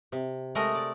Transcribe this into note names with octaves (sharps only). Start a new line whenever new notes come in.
C3
G#3 A3 A#4 D#5 F#5
D5